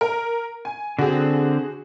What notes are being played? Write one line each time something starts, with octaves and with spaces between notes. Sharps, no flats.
A#4
G#5
D3 C4 F#4 G#4